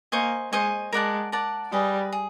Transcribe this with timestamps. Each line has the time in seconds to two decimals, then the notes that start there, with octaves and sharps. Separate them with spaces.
0.12 A#3 C5 D#5 G#5 C#6
0.52 G#3 C5 D#5 G#5 C#6
0.92 G#3 A#4 D5 F#5 A5
1.32 A#4 D5 F#5 A5
1.72 G3 G#4 B4 D#5
2.12 G#4